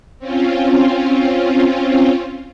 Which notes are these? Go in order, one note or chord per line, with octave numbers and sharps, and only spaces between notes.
C4 C#4 F4